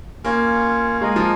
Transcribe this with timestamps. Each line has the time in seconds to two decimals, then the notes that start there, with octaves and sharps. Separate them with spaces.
0.24 A#3 C#4 F4 C#5
1.01 G#3 F4 A#4 D#5 G#5
1.16 F3